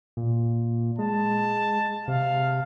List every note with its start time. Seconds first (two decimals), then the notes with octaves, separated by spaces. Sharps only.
0.17 A#2
0.99 G#3 A5
2.08 C3 F5